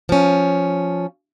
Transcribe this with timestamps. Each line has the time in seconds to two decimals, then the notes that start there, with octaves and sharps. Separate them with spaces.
0.09 F3 C#4